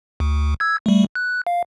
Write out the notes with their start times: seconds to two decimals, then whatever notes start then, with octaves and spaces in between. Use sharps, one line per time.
0.20 D2
0.60 E6 G#6
0.86 G3 A3
1.15 F#6
1.47 F5